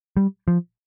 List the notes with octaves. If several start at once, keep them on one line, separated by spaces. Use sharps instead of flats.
G3
F3